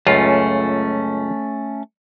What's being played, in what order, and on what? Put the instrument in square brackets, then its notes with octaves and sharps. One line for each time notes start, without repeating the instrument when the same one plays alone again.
[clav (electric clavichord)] C#2 F#2 F4 [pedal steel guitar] A3 C#4